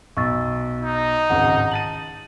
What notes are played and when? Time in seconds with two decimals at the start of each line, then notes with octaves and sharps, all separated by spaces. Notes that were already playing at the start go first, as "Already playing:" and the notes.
0.17 B1 C#6 E6 A6
0.82 D#4
1.30 D1 G#1 C#2 F#5
1.72 A5 A6 D#7 F#7